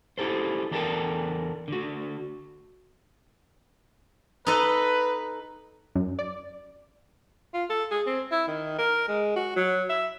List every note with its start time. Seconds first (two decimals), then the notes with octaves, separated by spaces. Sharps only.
0.18 E4 G4 A4 C5
0.71 E2 D4 A4 A#4 G5 A5
1.68 D3 F#4
4.46 D#4 A4 B4 D#5
5.95 F#2
6.19 D5
7.54 F4
7.70 A4
7.91 G#4
8.07 C4
8.31 E4
8.48 D#3
8.78 A#4
9.08 G#3
9.36 F#4
9.56 F#3
9.89 E5